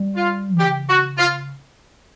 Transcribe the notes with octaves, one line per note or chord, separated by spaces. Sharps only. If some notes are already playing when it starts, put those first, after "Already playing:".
Already playing: G3
F4
C#3 G4
F#4
F4